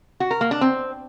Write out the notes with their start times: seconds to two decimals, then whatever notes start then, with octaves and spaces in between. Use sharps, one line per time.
0.20 F#4
0.31 A#4
0.41 A#3
0.51 D4
0.61 C4